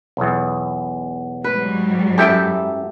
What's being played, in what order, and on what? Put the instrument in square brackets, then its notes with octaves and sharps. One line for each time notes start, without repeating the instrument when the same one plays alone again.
[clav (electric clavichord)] B1 E2
[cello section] G#2 F#3 G3 [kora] B4
[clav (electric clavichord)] F#2 E4 G5 [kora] G4 A4 E5